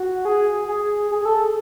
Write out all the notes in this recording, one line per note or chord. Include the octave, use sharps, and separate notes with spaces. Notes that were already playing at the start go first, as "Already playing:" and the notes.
Already playing: F#4
G#4
G#4
G#4
G#4
A4